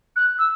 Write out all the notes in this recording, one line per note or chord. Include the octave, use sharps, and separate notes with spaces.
F#6
E6